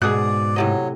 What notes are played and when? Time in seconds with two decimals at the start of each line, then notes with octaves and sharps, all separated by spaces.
0.02 G#2 B2 G#4 D5 D#6 F#6
0.56 A2 C3 F#3 D#5